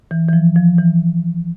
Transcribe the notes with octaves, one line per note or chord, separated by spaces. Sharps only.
E3
E3
F3
F3
E3